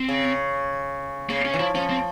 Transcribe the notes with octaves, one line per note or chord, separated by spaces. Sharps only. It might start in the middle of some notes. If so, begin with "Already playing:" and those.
Already playing: C4
C#3
C#3 A#3
C#3 C#4
E3
F3 E4
F3 C#4
C4